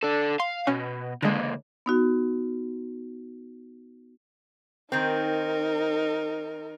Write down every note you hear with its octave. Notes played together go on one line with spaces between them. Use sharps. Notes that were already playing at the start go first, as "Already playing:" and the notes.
D4 A4
F5 C6
B2 C#4
C#2 D3 G#3 A#3
B3 D#4 F#4
D#3 C4 D#4 A#4